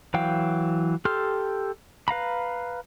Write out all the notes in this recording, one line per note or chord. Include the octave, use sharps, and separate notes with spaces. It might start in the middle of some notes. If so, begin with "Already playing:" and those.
E3 F#3 F5 G5
G4 A4 C6 F6
B4 F5 A#5 B5